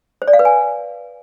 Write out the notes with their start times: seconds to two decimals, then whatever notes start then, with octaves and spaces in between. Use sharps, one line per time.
0.22 C5
0.28 D5
0.33 F5
0.39 B4
0.45 G#5